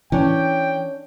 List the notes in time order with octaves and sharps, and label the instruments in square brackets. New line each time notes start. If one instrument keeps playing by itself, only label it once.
[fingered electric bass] E3 [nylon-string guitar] C#4 D4 [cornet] G5